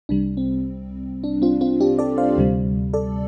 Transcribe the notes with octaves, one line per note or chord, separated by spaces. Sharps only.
C2 C3 G3 D4
C4
D4
C4 F4
C4 F4
D4 G4
A4 D5
C5 F5
D2 C3 G3
A4 D5